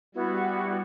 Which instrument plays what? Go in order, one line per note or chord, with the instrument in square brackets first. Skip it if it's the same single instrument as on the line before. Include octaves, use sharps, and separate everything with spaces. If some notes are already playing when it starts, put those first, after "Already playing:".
[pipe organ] G3 [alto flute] B3 [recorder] E4 [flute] F#4